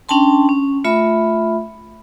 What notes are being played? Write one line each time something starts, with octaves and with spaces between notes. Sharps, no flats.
C#4 D4 G5 A5 C6
C#4
A3 F4 E5 B5